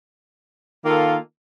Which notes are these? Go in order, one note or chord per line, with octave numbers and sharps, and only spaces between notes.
D#3 A#3 F4 A4